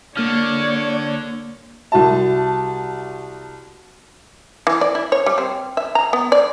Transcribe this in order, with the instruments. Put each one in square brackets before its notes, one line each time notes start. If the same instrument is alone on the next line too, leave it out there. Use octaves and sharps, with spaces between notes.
[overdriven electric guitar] D3 [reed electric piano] A#3 F6 [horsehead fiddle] C#5 D5
[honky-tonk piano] C2 A5 [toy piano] F#4 E5
[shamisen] E3
D5
E4
C#5
G3
C4
E5
A#5
B3
D5